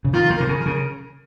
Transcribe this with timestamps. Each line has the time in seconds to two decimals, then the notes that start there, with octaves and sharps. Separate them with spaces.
0.05 C#3
0.13 D#3 F4
0.30 D#3
0.37 C3 A#4
0.49 C#3
0.59 A#4
0.66 C#3